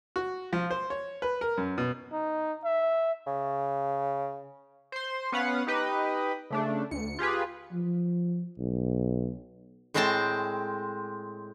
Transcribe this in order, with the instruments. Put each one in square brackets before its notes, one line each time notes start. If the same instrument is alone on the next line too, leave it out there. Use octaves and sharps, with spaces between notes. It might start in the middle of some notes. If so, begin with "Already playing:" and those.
[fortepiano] F#4
F3
C5
C#5
B4
A#4
F#2
B2
[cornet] D#4
E5
[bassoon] C#3
[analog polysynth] C5 C6
B3 C#4 B4 F5 F#5
D#4 G4 B4 D#5
C#3 A3 D4
D2 C#7
F4 G4 G#4 B4
[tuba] F3
B1
[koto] A2 G#3 C4 C5 G5 A5